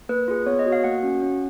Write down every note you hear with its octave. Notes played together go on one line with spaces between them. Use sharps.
A#3 B4
F4 G#4
B3 C#5
D#5
F#4
F5
A#3 F#5
C#4 F#4
C#4